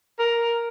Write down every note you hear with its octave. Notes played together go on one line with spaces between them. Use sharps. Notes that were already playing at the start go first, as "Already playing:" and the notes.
A#4